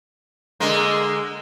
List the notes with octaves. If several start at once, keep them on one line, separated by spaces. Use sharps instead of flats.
D3 G#3 A#3